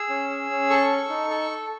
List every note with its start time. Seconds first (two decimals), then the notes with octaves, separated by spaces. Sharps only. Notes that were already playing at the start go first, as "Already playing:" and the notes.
Already playing: G#4 E6
0.10 C#4
0.30 G#4
0.50 C#4
0.70 A4 C#6
0.90 A4
1.10 D#4
1.30 A4